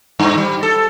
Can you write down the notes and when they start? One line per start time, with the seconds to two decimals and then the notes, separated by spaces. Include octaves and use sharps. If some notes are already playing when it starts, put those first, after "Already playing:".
0.20 G2
0.38 G3
0.63 A4